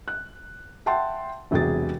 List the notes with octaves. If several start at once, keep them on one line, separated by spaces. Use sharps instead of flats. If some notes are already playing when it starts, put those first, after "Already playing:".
F#6
E5 F#5 G5 A5 C6
E1 E2 C3 F#3 G#4 A6